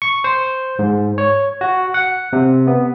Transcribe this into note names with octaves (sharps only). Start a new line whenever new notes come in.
C#6
C5
G#2
C#5
F#4
F#5
C3
B3